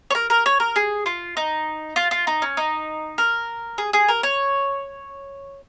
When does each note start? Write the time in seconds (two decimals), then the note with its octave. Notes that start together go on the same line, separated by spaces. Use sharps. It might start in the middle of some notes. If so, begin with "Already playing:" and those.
0.10 C#5
0.15 A#4
0.30 A#4
0.46 C#5
0.60 A#4
0.76 G#4
1.06 F4
1.37 D#4
1.96 F4
2.11 F4
2.27 D#4
2.42 C#4
2.57 D#4
3.18 A#4
3.78 G#4
3.93 G#4
4.08 A#4
4.23 C#5